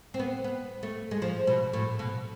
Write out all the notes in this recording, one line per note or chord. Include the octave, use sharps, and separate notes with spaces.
C4
B3
B3
A3
G#3
F3
B2
A2
B2